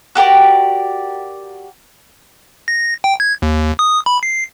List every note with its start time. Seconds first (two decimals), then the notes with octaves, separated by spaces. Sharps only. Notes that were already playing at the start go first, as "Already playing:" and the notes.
0.15 F#4 G4 A#4 D5
2.68 A#6
3.04 G5
3.20 G#6
3.42 D#2
3.79 D#6
4.06 B5
4.23 C7